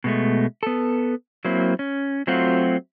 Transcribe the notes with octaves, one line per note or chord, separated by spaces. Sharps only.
B2 G#3 A3
B3 A4
F#3 A#3 C4 E4
C#4
F#3 A3 C4 F4 F#4